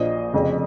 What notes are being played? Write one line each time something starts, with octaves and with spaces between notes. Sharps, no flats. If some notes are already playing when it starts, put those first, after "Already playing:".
Already playing: A#1 A#2 F3 C5 D#5
F1 F2 C#3